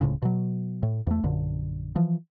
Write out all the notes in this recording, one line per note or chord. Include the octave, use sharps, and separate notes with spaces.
D1 C#2 A2 C#3
B2 F#3
A2
E2 A3
A#1 F#2 D3
E3 F3